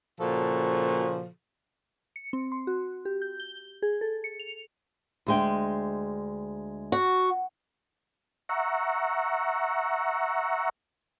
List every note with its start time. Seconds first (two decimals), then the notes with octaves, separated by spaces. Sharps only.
0.20 A#2 C#3 F3 F#4 A4
2.16 C#7
2.33 C4
2.52 C6
2.67 F#4
3.05 G4
3.22 G6
3.40 G7
3.82 G#4
4.01 A4
4.24 C#7
4.39 F7
5.27 D2 G#3 G5
6.92 F#4
8.49 E5 F#5 A#5 C#6